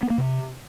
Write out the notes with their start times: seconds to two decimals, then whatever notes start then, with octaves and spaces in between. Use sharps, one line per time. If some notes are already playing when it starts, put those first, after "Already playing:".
0.03 B3
0.10 A#3
0.18 C3